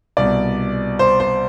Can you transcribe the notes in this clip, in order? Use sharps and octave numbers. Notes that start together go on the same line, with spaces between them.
C2 B2 D5
C5
C5